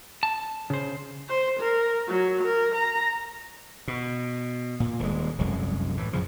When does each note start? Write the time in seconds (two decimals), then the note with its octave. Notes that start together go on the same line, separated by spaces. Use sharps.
0.23 A5
0.70 C#3 C5
1.28 C5
1.60 A#4
2.07 F#3
2.43 A#4
2.75 A#5
3.88 B2
4.80 A#2
4.99 D#1 G#3
5.38 F1 C2 F#2 G#3
5.97 A2 E3
6.13 F#2 C#3 F3